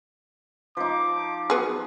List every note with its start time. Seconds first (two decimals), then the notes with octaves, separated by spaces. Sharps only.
0.77 F3 D#4 D6
1.50 F#3 B3 G#4